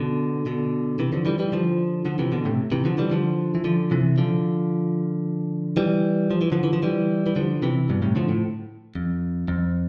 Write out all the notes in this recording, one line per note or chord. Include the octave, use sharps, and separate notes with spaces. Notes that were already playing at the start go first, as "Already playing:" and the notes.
Already playing: B2 D3
B2 D3
C3 E3
D3 F3
E3 G3
E3 G3
D3 F3
D3 F3
C3 E3
B2 D3
A2 C3
C3 E3
D3 F3
E3 G3
D3 F3
E3
D3 F3
C3 E3
D3 F3
E3 G3
F3
E3
D3 F3
E3
F3
E3 G3
E3
D3 F3
C3 E3
G2 B2
A2 C3
D3 F3
A2
F2
F2